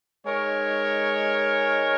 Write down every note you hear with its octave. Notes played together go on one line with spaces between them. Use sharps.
G#3 D#4 A#4 C#5